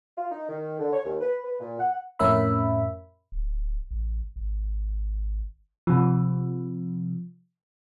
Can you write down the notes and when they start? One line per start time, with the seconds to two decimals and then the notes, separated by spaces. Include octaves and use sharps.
0.17 F4
0.30 D#4
0.49 D#3
0.79 D3
0.92 C#5
1.05 D#2
1.21 B4
1.44 B4
1.59 A#2
1.80 F#5
2.19 F2 A2 C#4 A#4 E5 B5
3.32 D1
3.91 A1
4.36 G#1
5.87 C3 F3